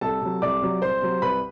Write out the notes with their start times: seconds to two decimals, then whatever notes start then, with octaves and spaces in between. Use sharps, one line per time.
0.01 C2 A4 A5
0.22 C3 F#3
0.42 C2 D5 D6
0.62 C3 F#3
0.82 C2 C5 C6
1.02 C3 F#3
1.22 C2 B4 B5